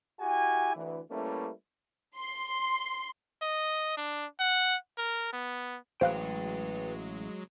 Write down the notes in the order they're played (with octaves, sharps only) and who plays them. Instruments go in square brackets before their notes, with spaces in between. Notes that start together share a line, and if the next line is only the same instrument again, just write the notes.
[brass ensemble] E4 F#4 G4 G#5
D2 E3
G3 A3 A#3 C#4 E4 B4
[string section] C6
[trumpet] D#5
D4
F#5
A#4
B3
[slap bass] A1 [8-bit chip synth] F#3 G#3 [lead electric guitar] B4 G5 [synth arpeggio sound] C5 F5 F#6